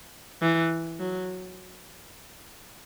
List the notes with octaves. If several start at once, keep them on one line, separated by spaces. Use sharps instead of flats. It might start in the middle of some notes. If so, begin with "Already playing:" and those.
E3
F#3